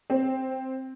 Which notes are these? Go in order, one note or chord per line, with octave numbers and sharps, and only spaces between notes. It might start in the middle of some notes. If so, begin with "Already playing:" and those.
C4